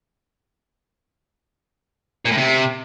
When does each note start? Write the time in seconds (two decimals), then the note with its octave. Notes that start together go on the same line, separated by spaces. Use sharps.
2.25 A#2
2.31 A2
2.37 C3